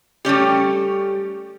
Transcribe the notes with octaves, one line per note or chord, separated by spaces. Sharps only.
G3 A3 C#4 G4